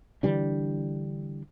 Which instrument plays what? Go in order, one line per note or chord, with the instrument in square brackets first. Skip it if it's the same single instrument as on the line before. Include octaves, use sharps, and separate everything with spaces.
[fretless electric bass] D3 E3 G3 D4